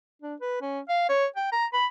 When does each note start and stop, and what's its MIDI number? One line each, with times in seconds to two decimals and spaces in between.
0.22 0.35 62
0.41 0.61 71
0.62 0.80 61
0.89 1.07 77
1.09 1.26 73
1.36 1.49 79
1.52 1.65 82
1.73 1.86 83